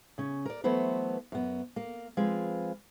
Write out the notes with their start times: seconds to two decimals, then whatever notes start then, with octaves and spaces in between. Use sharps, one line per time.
0.18 C#3 C#4
0.45 A#4 D5
0.64 E3 F#3 A3 B3 B4 C5
1.32 F#2 B3
1.76 A#3
2.17 F3 G#3 C4 F4 B4